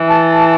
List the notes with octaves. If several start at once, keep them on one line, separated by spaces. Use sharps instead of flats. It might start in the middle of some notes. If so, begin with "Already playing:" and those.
Already playing: E3
A5